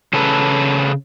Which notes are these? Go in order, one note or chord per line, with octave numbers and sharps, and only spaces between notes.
C#3 A4 B4